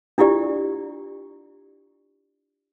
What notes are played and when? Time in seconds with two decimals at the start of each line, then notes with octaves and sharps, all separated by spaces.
0.18 D4 E4 F4 G4 D5